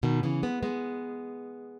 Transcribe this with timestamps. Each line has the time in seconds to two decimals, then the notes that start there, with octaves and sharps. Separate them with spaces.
0.03 B2 D#3
0.23 C#3 E3
0.43 G#3 B3
0.63 G#3 B3